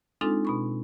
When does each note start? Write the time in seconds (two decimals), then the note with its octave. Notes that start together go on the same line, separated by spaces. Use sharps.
0.21 G#3 C4 D4 D#4 F4 A4
0.45 B2 B5 C#6